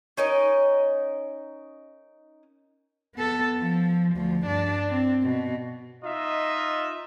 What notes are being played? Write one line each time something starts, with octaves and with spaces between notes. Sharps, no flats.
C#4 D#4 A#4 D#5
B3 A4
F3
D2 F3
G2 D4
C4
B2
D#4 F4 D#5 E5